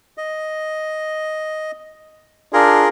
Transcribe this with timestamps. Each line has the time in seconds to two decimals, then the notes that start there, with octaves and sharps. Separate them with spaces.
0.18 D#5
2.53 D4 F4 G#4 A#4